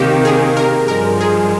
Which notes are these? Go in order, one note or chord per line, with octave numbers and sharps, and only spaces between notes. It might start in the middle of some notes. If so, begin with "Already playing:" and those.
Already playing: C3 D#3 A#3 D#4 G4
G#4
A#4
G2 F3 G#3 A#4
G#4